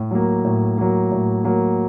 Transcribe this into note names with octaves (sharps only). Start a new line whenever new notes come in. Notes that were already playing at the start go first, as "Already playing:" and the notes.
Already playing: A2
F#3 A#3
A2
F#3 A#3
A2
F#3 A#3